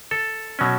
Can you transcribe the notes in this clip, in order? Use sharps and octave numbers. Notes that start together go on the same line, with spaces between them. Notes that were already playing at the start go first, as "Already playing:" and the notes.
A4
B2 F#3 C#4